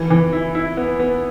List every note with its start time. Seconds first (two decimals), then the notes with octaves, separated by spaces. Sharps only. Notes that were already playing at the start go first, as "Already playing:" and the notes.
Already playing: E3
0.10 E3
0.33 E4
0.55 E4
0.77 B3
0.99 B3